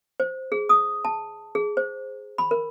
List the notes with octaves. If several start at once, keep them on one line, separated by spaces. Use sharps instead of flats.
C5
G#4
D#6
A5
G#4
C5
B5
A#4